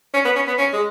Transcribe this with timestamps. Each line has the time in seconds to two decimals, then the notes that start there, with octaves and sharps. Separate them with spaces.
0.14 C#4
0.25 B3
0.36 C#4
0.47 B3
0.58 C#4
0.73 G#3